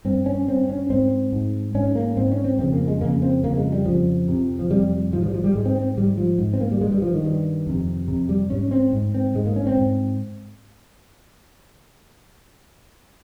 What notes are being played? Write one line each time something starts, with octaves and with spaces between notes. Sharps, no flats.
G2 C4
C#4
G2 C4
C#4
G#2 C4
G#2
G#2 C#4
A#3
G#2 C4
C#4
C4
F2 C#3 C4
A#3
G#3
F2 C#3 A#3
C4
F2 C#3 A#3
G#3
G3
F2 C#3 F3
F2 C3
F3
F2 C3 G3
G#2 F3
F3
G3
F3
G3
G#2 G#3
C4
C4
G#2 G3
F3
G#2
C4
A#3
G3
G2 G#3
G3
F3
D#3
G2
F2 C3
F2 C3
G3
G#2 C#4
C4
G#2
C4
G#2 G#3
A#3
C#4
C4
G#2